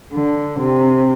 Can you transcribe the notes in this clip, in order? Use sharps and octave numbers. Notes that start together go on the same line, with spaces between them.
D3
C3